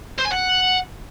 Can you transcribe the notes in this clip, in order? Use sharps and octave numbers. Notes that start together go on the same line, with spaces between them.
C5
G#5
F#5